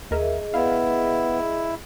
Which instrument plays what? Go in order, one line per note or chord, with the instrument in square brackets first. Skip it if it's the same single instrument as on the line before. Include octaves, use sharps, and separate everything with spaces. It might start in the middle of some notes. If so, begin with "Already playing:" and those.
[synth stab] D#2 A#4 E5 [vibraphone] G#4 D#5
[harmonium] B3 [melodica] E4 [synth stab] F5